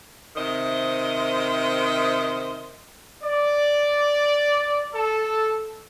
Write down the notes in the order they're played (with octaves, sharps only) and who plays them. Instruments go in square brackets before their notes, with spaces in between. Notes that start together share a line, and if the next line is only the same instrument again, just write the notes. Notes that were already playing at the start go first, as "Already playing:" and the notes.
[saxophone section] C3 D#3 C5 D#5 E5
[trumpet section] D5
A4